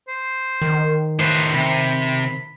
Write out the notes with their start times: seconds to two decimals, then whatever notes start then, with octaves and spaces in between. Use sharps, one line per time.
0.09 C5
0.62 D#3
1.20 A2 B4 C5
1.54 C3 B5